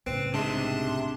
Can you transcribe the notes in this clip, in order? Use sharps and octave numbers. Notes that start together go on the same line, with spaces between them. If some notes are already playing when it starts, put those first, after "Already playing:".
C2 A2 C#3 C4 B4
G#2 C3 D4 A5 C6